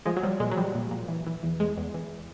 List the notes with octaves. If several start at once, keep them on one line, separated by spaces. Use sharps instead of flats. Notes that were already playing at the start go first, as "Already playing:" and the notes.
F3 G#3
F#3
F3 G3
A#2 G#3
F#3
F3 G3
A#2
A#2
E3
E3
E2
E2 G#3
E2
E3